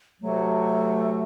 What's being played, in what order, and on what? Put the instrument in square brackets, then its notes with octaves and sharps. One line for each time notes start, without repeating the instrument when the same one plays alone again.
[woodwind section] D2 C3 F#3 [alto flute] A3